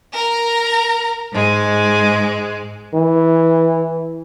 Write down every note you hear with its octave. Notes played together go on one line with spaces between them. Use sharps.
A#4 A#5
G#2 G#3
E3